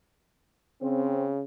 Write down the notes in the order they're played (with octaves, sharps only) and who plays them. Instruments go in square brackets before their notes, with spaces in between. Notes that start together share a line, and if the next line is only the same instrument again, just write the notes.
[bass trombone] C#3 [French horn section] C4